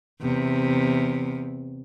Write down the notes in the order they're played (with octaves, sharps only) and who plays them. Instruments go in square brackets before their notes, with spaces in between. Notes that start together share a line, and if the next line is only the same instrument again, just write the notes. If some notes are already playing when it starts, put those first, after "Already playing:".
[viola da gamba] E2 C3